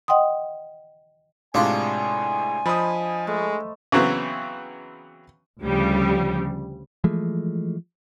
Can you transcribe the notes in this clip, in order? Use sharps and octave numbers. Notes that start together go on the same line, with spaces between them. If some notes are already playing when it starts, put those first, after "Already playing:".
D#5 F#5 G5 C6 D#6
A2 C3 G#3 D4 F4 G#5
F3 C5 D#5 B5 D#6
G#3 A3
C#3 E3 F#3 B3 C4
D2 C#3 F3 G3
E3 F3 G#3 A3